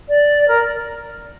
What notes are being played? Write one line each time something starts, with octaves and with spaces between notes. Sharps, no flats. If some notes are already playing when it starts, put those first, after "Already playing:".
D5
A#4